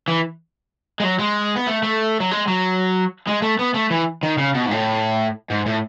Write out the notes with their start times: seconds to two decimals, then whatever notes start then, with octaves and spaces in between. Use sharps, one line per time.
0.08 E3
1.00 G#3
1.04 F#3
1.19 G#3
1.56 B3
1.67 A3
1.83 A3
2.20 F#3
2.31 G#3
2.48 F#3
3.27 G#3
3.42 A3
3.59 B3
3.74 A3
3.91 E3
4.23 D#3
4.38 C#3
4.54 B2
4.66 G#2
4.71 A2
5.50 G#2
5.66 A2